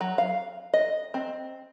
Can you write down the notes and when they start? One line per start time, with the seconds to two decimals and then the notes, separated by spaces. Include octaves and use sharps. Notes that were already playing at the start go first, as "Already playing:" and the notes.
0.01 F#3
0.18 F5
0.74 D#5
1.14 C4